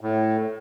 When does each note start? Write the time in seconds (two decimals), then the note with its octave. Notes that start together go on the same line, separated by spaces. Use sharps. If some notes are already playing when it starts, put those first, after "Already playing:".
0.01 A2